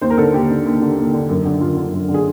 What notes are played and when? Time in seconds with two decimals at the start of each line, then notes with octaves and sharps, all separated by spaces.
0.01 D#2 C5
0.10 A#4
0.18 D3 A4
0.34 D#2 G4
0.49 D3
0.65 D#2
0.81 D3
0.97 D#2
1.14 D3
1.29 F#2
1.45 D3
1.61 F#2 F4
1.76 D3
1.92 F#2
2.09 D3
2.14 G#4